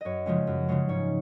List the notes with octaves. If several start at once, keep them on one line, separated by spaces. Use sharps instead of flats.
F#2 C#5 D#5
C#3 F3 G#3 C#4
F#2
C#3 F3 G#3 C#4
G#2 C#5